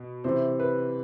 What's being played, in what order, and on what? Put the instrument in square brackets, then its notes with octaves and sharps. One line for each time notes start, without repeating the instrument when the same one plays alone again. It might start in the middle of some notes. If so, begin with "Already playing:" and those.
Already playing: [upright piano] B2
C3 E3 C5
B4